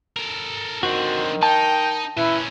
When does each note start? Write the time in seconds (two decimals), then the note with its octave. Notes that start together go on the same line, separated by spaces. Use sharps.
0.16 A4 A#4
0.83 F2 D3 D#3 F#4 C5
1.43 D#4 G5 A5
2.17 A#2 C#4 E4 B4